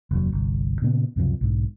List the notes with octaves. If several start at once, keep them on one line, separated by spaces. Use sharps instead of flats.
F1 D#2 A#2 F#3
G1 C2
A#2 C#3 A#3 B3
C#2 F#2 C3 F3
B1 G#2